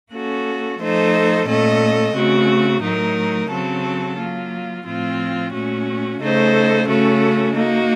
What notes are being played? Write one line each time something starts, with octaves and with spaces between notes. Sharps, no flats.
A#3 C#4 F#4 A4
F3 A3 D#4 A4 C5
A#2 A3 C#4 A4 D#5
C#3 A3 C4 F#4
A2 F#3 A3 D#4 A#4
C#3 F#3 C4 F#4 A4
F#3 A#3 F4
A2 F3 C4 F4
A#2 A3 C#4 F#4
C#3 A3 D#4 A4 C5
C#3 A3 C#4 F#4 A4
A#3 D#4 F#4